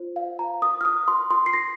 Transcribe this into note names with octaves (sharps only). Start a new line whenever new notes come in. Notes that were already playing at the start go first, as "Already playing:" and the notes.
Already playing: F4 C5
F5
A#5
D#6
F6
D#6
C6
C6
C7
A#6